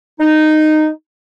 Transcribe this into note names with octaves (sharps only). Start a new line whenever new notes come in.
D#4